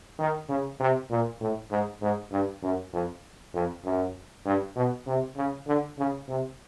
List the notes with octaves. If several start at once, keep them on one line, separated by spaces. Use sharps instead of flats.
D#3
C#3
C3
A#2
A2
G#2
G#2
G2
F#2
F2
F2
F#2
G2
B2
C3
C#3
D3
C#3
C3